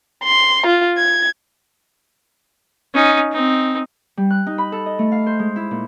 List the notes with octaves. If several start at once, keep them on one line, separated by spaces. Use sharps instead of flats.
C6
F4
G#6
C#4 D#4
C4 D#4
G3
F#6
D#4
B5
A4
D#5
A3
F5
C5
G#3
E4
A#2